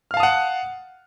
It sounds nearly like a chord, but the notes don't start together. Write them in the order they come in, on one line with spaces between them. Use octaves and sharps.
F6 F5 A5 D#6 F#5